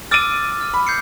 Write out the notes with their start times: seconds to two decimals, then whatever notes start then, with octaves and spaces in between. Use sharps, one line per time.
0.11 D6 E6 F6 A6 D7 D#7
0.61 F6
0.74 B5
0.87 G6 C7 C#7